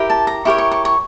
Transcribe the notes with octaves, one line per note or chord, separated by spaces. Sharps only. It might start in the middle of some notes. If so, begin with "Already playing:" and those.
Already playing: E4 G4 A#4
A5
A#5
E4 G4 A#4 C#5 C#6
C#6
C#6
C#6